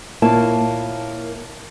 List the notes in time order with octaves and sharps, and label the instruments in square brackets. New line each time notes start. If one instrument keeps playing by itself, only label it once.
[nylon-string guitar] A#2 A#3 E4 F4 C#5 A5